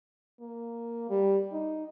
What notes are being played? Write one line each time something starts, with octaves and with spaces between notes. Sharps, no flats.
A#3
G3
D#4